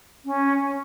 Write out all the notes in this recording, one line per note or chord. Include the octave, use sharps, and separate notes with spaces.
C#4